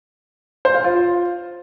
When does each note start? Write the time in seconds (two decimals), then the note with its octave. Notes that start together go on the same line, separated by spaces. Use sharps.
0.65 C5
0.75 F5
0.84 F4